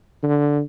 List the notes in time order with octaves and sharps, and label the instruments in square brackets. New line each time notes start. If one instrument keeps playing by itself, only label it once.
[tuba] D3